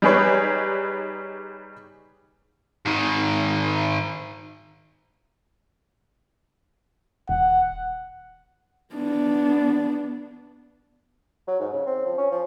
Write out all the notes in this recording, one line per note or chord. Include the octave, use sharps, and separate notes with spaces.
G3 D#4 G4 G#4 B4 C#5
G#2 D#3
D#1 F#5
B3 D4
F#3
G#2
C#3
C4
F3
C#4
F3